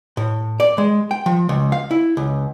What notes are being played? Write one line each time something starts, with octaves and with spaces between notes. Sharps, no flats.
A2
D5
G#3
G5
F3
C#2
F5
E4
C#2